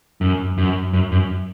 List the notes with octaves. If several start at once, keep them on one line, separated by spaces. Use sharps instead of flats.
F#2
F#2
F#2
F#2